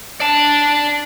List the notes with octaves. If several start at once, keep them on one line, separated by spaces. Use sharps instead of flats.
D5 A5